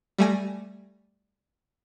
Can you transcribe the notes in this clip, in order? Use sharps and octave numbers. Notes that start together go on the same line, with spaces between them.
G3 A3 G#5 A#6